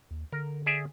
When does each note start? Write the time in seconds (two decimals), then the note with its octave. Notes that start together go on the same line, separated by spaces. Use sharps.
0.11 D#2
0.32 D3 A#4
0.66 G#4 D5 E5